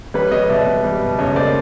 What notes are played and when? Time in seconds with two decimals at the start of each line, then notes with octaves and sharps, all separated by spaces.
0.14 G3 B4 C#5
0.32 G3 C#5 D#5
0.49 B2 D5 E5
0.67 G3
0.84 G3
1.01 B2
1.19 C#2 C#5 D#5
1.36 A#3 C5 D5